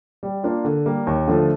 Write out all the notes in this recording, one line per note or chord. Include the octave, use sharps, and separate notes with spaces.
G3
A#3 D4 F4
D3
G3 A#3
D#2
D3 F3 A3